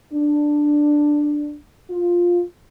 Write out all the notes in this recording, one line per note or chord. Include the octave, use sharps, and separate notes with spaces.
D4
F4